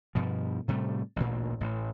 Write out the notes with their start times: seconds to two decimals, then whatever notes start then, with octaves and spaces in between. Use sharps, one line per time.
0.15 G2 B2 F3
0.68 A2 C3 G3 A3
1.16 A1 D2 A#2
1.61 A1 A2